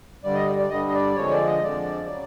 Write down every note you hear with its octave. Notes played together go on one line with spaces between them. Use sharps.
G2 D3 G3 D5
D#5
D5
D5
G2 D3 G3 D#5
D#5
D5
F2 D3 F3 G#3 C#5
D5
D#5
F2 D3 F3 G#3 D5
C#3 F#3